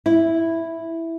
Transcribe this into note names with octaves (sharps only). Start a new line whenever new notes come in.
E4